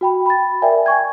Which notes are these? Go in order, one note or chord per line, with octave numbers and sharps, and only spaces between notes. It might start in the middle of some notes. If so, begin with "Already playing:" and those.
F#4 G5 B5
B5 A6
A#4 D5 E5 G5 G#5
G#5 C#6 G#6